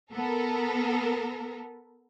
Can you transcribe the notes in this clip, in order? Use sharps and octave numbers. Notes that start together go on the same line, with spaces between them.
B3 A4 A#4